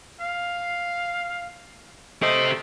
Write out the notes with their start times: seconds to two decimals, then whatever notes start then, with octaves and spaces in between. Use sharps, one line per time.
0.21 F5
2.22 A3 G4 C5 D#5